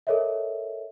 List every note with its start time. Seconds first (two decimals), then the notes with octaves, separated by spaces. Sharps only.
0.07 A4 A#4 C#5 D#5 E5